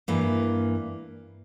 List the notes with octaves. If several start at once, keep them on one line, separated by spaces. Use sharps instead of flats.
G2 E3 A#3